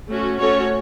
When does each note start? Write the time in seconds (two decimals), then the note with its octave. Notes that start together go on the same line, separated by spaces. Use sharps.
0.10 A3 C#4 F#4
0.38 A3 C#4 F#4 A4 C#5